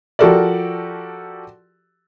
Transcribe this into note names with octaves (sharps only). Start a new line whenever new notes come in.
F3 F#4 G4 A4 A#4 D5